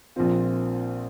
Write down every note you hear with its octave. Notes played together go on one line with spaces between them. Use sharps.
A#1 A#2 F3 C4 F4